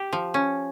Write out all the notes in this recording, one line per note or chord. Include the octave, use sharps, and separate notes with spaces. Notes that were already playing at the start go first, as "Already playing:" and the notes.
Already playing: G4
F3
C#4